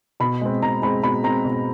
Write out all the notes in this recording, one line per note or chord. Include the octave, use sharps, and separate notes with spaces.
B2 B5
G#3 C4
B2 A#5
G#3 C4 B5
B2 B5
G#3 C4 A#5
B2